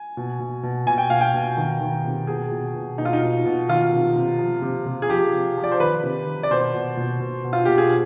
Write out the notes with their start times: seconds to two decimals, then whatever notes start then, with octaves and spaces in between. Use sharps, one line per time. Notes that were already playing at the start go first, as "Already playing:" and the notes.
Already playing: G#5
0.17 B2
0.40 B2
0.63 B2
0.86 B2 G#5
0.98 G5
1.10 B2 F5
1.21 G5
1.34 B2
1.57 D#3
1.81 D#3
2.05 C3
2.27 B2 G#4
2.52 B2
2.75 B2
2.98 B2 D#4
3.05 F4
3.13 D#4
3.22 B2
3.46 B2
3.69 D#3 F4
3.93 C3
4.16 C3
4.39 F3
4.62 C3
4.86 C3
5.02 G#4
5.09 F3 G4
5.33 C3
5.57 F3
5.63 D5
5.71 C5
5.80 D#3 B4
6.03 C3
6.26 D#3
6.43 D5
6.51 B2 C5
6.75 B2
6.97 B2
7.20 B2
7.44 B2
7.53 F4
7.65 B2 G4
7.78 G#4